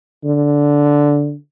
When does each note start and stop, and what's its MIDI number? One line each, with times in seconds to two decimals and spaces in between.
0.25 1.35 50